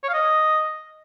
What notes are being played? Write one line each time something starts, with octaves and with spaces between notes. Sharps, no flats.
C#5
F5
D#5